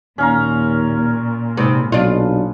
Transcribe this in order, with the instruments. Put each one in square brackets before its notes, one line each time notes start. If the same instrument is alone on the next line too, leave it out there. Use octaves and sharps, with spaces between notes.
[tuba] D#2 [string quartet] A#2 [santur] C#4 F5 A#5
[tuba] G#2 [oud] C3 [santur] B3
[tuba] B1 [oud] D4 F4